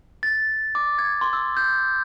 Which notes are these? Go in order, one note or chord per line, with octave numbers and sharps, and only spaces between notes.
A6
D6
G#6
C6
E6
G6